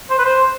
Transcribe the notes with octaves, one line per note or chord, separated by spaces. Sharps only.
C5
B4
C5